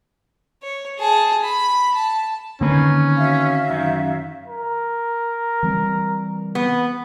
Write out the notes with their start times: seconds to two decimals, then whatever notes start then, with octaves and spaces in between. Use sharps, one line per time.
0.62 C#5
0.99 G#4 A5
1.43 B5
1.95 A5
2.61 D3 D#3 A#3 C4 C#4 B4
3.17 F#4 E5 F5
3.70 F#2 D#3 C#4
4.48 A#4
5.63 E3 G3 C4
6.55 B3